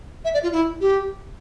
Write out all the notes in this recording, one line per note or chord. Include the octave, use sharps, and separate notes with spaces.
E5
D5
F4
E4
G4